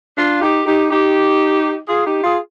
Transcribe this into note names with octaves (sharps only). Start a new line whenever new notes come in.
D4 F4
D#4 G4
D#4 G4
D#4 G4
F4 G#4
D#4 G4
F4 G#4